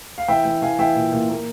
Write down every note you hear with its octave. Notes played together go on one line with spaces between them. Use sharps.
F5
E3 E5 G5
E3
E3 F5 G#5
E3 E5 G5
A#2
A#2
A#3